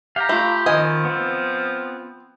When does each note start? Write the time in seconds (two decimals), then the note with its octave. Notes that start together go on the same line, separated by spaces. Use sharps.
0.16 G4 F5 A#5
0.29 A3 F4 B5
0.66 D#3 F3 C4 D#5 G#5
1.05 B3 C4